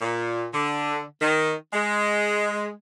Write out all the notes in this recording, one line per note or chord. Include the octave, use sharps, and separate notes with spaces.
A#2
D3
D#3
G#3